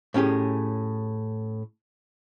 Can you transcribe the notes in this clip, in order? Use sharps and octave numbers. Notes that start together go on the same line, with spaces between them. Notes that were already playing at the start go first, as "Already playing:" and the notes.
A2 C#4 G4 G#4